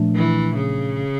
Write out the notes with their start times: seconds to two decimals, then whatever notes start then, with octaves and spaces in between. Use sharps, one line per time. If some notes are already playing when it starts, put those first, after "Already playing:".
Already playing: A#2 F3 A3 D4
0.16 E3
0.56 C#3